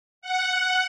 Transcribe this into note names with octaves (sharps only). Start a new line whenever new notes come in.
F#5